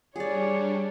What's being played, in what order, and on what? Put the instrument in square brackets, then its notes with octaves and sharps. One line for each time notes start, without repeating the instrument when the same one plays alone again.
[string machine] G3 D4 [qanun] G#4 D5 [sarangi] C#5